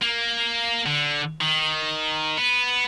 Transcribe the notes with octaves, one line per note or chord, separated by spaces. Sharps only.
A#3
D3
D#3
B3